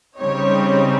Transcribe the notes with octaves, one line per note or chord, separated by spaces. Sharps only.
C#3 G3 C4 D#4 C#5